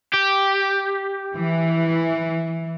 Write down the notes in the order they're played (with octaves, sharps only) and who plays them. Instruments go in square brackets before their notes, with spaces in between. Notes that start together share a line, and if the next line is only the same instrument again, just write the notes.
[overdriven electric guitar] G4
[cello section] E3